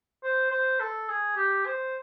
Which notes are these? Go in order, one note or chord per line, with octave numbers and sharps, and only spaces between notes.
C5
C5
A4
G#4
G4
C5